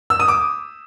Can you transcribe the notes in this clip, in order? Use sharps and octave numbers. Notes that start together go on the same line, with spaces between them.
E6
D#6
D6